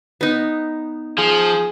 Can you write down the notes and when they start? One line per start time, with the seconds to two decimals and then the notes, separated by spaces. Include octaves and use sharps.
0.21 B3 D#4
1.18 F3 G#4